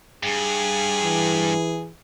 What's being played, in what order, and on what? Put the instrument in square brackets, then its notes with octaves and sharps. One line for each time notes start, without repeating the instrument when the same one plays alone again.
[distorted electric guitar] G2 [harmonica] G#4
[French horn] E3